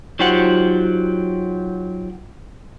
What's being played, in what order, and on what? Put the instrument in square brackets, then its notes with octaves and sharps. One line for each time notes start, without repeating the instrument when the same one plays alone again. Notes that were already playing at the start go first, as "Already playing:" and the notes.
[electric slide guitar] F#3 D#4 F4 G4 C5 F#5